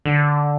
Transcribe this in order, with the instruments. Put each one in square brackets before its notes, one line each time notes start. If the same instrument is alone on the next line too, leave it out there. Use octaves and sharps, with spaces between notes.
[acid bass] D3